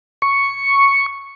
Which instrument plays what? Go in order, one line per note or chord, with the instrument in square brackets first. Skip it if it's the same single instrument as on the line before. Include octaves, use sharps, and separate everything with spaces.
[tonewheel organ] C#6